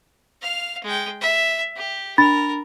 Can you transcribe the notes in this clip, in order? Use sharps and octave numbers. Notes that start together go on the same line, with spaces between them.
F5 F6
G#3 G5
E5
G4
D4 A#4 B5 A6